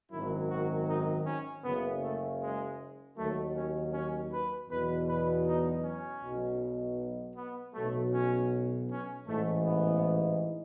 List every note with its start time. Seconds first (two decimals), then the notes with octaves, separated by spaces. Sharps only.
0.11 G#1 F#2 D#3 F#3 E4
0.49 F#4
0.88 D#4
1.25 C#4
1.63 F#1 F#2 C#3 B3
2.02 A3
2.41 G#3
3.17 D#2 D#3 F#3 A3
3.55 C#4
3.93 C#4
4.31 B4
4.70 E2 B2 F#3 B4
5.08 B4
5.46 D#4
5.84 C#4
6.22 B1 B2 F#3
7.36 B3
7.74 B1 B2 F#3 A3
8.12 C#4
8.90 C#4
9.27 A1 G#2 E3 A3
9.66 B3